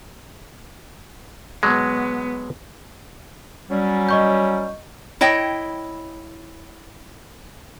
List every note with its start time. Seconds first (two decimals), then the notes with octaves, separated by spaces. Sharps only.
1.63 B2 F#3 G#3 B3
3.71 F#3 G3 C#4
4.09 D#5 C#6 G6
5.21 E4 C#5 D#5 G5